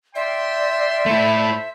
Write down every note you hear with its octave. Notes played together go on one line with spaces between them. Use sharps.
F4 D5 E5 G5 C6
A3 E4 A4 C5